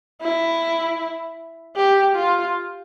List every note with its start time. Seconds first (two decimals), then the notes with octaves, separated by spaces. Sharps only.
0.22 E4
1.76 G4
2.15 F4